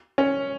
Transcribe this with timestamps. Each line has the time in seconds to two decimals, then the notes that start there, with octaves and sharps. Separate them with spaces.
0.18 C#4